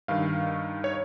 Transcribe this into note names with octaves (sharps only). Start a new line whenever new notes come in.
G2 D#3 F5
C#5